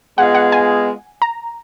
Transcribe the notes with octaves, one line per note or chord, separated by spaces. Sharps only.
G#3 B3 F4 G#4 D#5 F#5
F#5
G#5
A#5